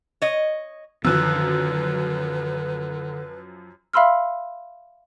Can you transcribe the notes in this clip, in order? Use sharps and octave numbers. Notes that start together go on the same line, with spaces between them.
C#5 D#5
F#2 D3 D#3 F3 F#3 B4 E6 F#6
E5 F5 B5 C6 E6 F6